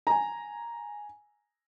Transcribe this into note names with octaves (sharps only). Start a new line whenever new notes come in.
G#5 A#5